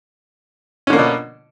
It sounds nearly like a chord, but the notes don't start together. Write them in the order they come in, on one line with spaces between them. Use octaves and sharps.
C#4 D3 A#3 D4 B2